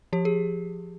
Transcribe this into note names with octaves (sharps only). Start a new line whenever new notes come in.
F3 G4
G#4